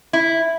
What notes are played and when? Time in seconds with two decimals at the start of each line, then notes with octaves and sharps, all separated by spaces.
0.13 E4